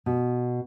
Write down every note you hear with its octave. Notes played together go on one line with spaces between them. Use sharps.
B2